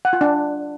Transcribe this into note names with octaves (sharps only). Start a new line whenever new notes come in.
F#5
F4
D4